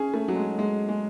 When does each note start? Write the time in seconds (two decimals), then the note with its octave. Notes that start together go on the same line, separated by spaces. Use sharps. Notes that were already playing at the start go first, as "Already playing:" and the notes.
Already playing: C#4 G#4
0.14 A3
0.28 F#3
0.36 G#3
0.59 G#3
0.89 G#3